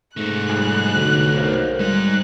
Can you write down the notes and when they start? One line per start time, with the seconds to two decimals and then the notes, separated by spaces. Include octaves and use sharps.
0.17 G#2 A3 D#4 F#6
0.50 F2 G3 G#4
0.94 B1 D3
1.37 A#4 C5 F5
1.80 G3 G#3 D#4 F#6